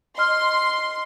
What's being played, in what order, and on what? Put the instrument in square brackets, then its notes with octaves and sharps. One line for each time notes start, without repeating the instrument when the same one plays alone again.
[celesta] D#5 F6 [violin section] C6